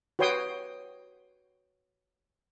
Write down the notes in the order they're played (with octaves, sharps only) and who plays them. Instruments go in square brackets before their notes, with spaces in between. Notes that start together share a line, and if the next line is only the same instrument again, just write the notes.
[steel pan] F#4 B4 C#5 G5 C6 D#6